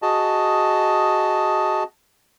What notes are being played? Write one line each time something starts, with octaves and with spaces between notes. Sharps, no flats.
F#4 G#4 D#5 A5